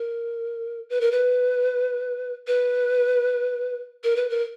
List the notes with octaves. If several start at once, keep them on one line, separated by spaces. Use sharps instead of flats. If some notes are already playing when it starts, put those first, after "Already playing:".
Already playing: A#4
B4
A#4
B4
B4
A#4
B4
A#4